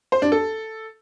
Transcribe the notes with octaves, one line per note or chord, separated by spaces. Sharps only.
C5
D4
A4